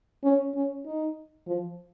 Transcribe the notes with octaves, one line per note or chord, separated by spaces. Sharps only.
C#4
C#4
D#4
F3